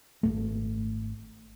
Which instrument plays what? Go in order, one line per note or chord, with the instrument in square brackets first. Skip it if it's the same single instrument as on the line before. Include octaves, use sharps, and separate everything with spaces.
[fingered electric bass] G#1 C#2 A3